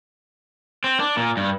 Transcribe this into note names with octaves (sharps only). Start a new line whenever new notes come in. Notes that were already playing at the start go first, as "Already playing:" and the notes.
C4
D4
A#2
G2